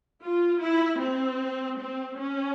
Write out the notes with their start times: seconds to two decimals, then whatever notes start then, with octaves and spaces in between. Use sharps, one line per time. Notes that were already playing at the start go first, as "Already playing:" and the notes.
0.23 F4
0.62 E4
1.01 C4
1.79 C4
2.19 C#4